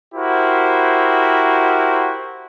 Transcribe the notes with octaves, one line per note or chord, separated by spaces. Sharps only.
E4 F#4 G4 A#4 C5